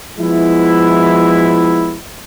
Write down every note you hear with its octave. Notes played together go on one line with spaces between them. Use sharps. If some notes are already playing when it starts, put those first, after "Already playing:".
F3 G#3 B3 E4